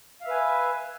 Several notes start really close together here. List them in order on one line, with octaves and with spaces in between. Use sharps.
F5 E5 B4 G#5